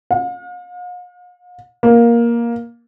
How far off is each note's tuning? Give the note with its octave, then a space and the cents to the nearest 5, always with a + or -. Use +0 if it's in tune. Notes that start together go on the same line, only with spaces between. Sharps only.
F5 +45
A#3 +10